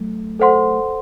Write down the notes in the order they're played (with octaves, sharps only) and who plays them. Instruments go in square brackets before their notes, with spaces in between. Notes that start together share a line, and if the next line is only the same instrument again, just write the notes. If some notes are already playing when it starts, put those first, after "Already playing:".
Already playing: [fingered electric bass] F#3 A3
[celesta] A4 C5 F#5 C6